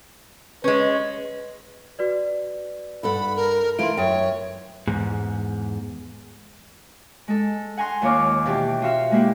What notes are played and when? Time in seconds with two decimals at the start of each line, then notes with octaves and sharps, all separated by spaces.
0.64 G#3 C#4 B4
1.99 F#4 B4 D5
3.03 G2 A4 F#5 B5
3.36 A#4
3.79 E3 A3 F4 A#4 C6 D7
3.97 F#2 A#4 C#5 E5 G5
4.88 E2 G#2
7.28 G#3 A4
7.77 F#5 G#5 A#5 C6
8.02 D#2 A#3 F4 C#5 D6 F6
8.46 B2 E3 G4
8.82 F4 F#4 E5 F5
9.11 G#3 A#3 E4 G4